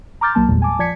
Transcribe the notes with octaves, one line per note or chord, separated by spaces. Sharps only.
A#5 C6 D6 F6 G6 A6
B1 F#3 A#3 A5
G#1 E2 A#2 G3 G#3
G#5 A5 D6
F3 D5 A5 G#6 B6 C#7